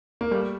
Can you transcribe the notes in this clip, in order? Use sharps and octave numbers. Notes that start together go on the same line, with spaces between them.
A#3
G3 A3